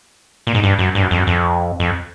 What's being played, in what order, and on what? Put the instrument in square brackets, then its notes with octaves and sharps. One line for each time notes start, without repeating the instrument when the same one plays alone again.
[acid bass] A#2
G#2
G2
F#2
G2
F#2
F2
F#2
F2
F2